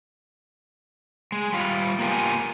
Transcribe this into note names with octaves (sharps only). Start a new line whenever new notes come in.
G#3
G3 F4
A#3 B3 F4 G4 A#4 G#5